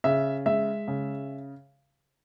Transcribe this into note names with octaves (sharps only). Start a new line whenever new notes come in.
C#3 E5
G#3 E5
C#3